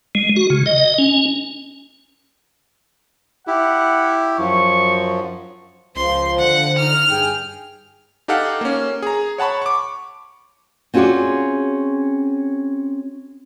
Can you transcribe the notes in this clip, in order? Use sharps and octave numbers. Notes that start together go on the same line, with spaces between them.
G#3
F#4
C#3
D#5
C#4
E4 G4 F#5
F#2 F3 C#6
C#2 F3 C6
D3 F#5
D#4 F6
G2 G#4 G5
D#4 G4 A4 F5 F#5
A#3 C#4
G#4 A#5
C#5 F#5 A5 B5 C#6
C#6 D6
C4 C#4 F4 F#4 G#4 D5